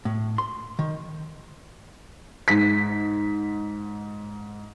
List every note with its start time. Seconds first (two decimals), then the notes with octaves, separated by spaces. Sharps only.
0.05 A2
0.38 C6
0.79 D#3
2.48 G#2 B6